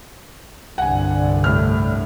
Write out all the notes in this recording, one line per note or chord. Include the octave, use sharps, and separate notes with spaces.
C2 G2 D3 F#5 G#5
A2 F6